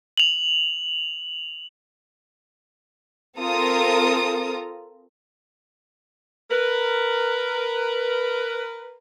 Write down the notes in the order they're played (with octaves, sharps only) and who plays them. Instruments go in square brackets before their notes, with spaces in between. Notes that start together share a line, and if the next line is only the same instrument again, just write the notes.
[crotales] F7 F#7
[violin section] C4 F4 A4 A#4 A#5 D#6
[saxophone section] A#4 B4